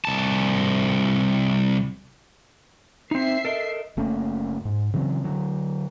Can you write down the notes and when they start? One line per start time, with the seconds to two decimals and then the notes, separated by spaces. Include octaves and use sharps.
0.05 C2 A5
3.11 C4 D#4 E5 C7
3.45 A4 A#4 D#5
3.97 F#1 A3 A#3 C#4
4.65 G#2
4.94 C#3 E3 F#3 C4
5.24 D3 F#3